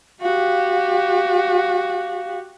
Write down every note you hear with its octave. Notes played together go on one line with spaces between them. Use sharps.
F#4 G4 F5